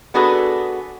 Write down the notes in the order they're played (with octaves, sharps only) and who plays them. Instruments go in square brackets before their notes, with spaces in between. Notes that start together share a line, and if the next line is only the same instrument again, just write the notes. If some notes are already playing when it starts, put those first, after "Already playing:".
[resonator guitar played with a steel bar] B3 D4 F#4 G#4 A4 B4